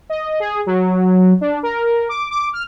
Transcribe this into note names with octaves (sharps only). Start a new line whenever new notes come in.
D#5
G#4
F#3
D4
A#4
D6
D6
F6